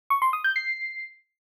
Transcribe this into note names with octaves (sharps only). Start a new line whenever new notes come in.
C#6
C6
D#6
G6
C7